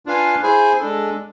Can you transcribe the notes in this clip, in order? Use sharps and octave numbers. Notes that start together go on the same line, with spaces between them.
D4 F4 B4 F5 G#5
E4 G#4 C5 G#5
G#3 D4 A4